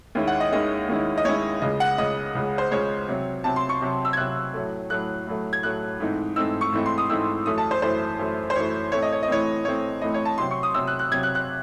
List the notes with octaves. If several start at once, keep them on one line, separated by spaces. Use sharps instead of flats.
D#2 D#3 G#3 C#4 E4
F#5
D#5
D#2 D#3 G#3 C#4 E4 D#5
D#2 D#3 G#3 C#4 E4
D#5
D#2 D#3 G#3 C#4 E4 C#5
C#2 C#3 G#3 D#5
F#5
C#2 C#3 G#3 D#5
C#2 C#3 G#3
C5
C#2 C#3 G#3 C#5
C3 F#3 C4
C3 F#3 C4 A5
C6
C#6
C3 F#3 C4
E6
G#6
C3 F#3 C4 F#6
A2 F#3 A3
A2 F#3 A3 F#6
A2 F#3 A3
G#6
A2 F#3 A3 F#6
G#2 E3 A3 C4 D#4
G#2 E3 A3 C4 D#4 E6
C#6
G#2 E3 A3 C4 D#4
C6
D#6
G#2 E3 A3 C4 D#4 E6
F#2 E3 A3 D#6
A5
C5
F#2 E3 A3 C5
F#2 E3 A3
C5
F#2 E3 A3 C#5
A2 E3 A3 C4 C#5
D#5
C#5
D#5
A2 E3 A3 C4 C#5
A2 E3 A3 C4 C#5
A2 E3 A3 C4 D#5
C#5
A5
C3 F#3 C4 C6
C#6
D#6
C3 F#3 C4 E6
F#6
F#6
C3 F#3 C4 G#6
F#6
F#6